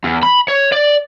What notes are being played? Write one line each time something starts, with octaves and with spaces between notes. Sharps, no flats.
E2
B5
C#5
D5